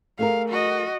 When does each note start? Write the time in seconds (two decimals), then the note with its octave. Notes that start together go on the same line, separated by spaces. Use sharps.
0.19 A3 G#4 A#4 F5
0.49 F#4 D#5